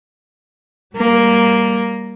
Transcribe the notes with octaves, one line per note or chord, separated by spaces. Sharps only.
G3 A#3